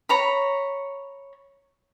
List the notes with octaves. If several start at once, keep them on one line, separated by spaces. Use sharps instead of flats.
C#5 A#5 B5